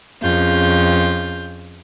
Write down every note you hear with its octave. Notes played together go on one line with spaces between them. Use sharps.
F2 C#3 F4 G6